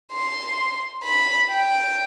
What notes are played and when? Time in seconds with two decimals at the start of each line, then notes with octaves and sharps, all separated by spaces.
0.12 C6
1.04 B5
1.50 G5